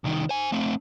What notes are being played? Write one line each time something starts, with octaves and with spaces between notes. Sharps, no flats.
C2 D#3
C5 G#5
A3 C4